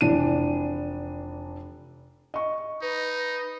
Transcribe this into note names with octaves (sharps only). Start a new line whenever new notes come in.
F1 E3 D4 D#7
D#5 C#6
D#4 B4